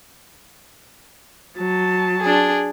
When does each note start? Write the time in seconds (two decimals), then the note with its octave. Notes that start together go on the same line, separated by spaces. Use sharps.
1.58 F#3 A5
2.21 D4 G#4